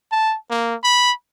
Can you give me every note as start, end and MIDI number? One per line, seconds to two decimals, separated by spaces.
0.12 0.36 81
0.50 0.75 58
0.84 1.12 83